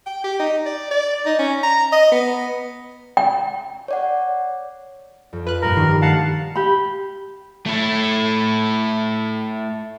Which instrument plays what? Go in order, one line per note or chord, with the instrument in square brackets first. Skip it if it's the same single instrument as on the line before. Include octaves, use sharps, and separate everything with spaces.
[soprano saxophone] G5
G4
D#4
D5
D5
D#4
C#4
A#5
D#5
B3
[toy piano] G5
[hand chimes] C#5 D5 F#5
[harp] F2
[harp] F4 [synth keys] B4 F#6
[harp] G1 G2 A#2 [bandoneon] A#4
[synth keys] D#3 G3 [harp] C7
[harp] A3 [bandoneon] F5 F#5 A5
[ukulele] G4 B5
[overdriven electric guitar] A3 E4